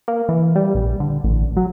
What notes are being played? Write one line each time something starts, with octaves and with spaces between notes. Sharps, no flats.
A#3
E3
G3
A#1
D3
A1
F#3